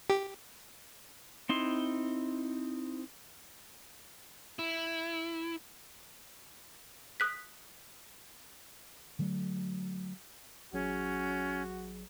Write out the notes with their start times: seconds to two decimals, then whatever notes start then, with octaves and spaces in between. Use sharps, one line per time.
0.10 G4
1.49 C4 D#4 E4 C6
4.59 E4
7.20 D#6 F#6 B6
9.19 D3 F#3 A3
10.73 A1 F#3 C#4 F#4 G#4